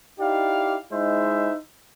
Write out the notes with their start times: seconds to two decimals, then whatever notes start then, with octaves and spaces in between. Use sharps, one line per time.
0.20 D#4 E4 G4 D5 F5
0.92 G#3 D#4 E4 C5 E5